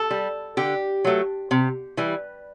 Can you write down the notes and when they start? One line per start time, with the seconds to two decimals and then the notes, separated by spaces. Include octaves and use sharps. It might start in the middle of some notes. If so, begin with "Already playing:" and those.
Already playing: A4
0.11 G3
0.57 D3 G4
1.05 F#3 A3
1.51 C3
1.97 E3 G3